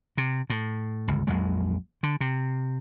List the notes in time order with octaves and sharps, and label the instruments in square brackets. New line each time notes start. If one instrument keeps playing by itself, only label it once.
[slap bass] C3
A2
G1 C#2
A#1 F2 F#3 G#3
D3
C3